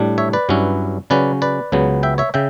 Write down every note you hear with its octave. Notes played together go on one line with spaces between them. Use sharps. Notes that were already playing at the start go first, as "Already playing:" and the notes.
Already playing: A2 G3 D4
C#5 E5
B4 D5
G2 F#3 C#4 E4
C#3 F#3 C#4 B4 D5
B4 D5
C#2 C#3 F#3 B3
E5 G5
C#5 E5
C#3 E5 G5